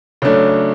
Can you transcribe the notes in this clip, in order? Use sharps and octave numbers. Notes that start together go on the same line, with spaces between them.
C#3 F#3 A3 D4